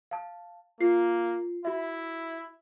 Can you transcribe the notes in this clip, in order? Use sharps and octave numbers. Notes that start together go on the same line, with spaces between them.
F5 A5
A#3 F4 C7
E4 F#4 E5